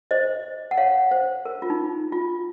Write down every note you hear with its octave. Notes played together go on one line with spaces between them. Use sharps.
C5 D#5
F#5
C#5 F5
C5
A#4
F4
D#4
F4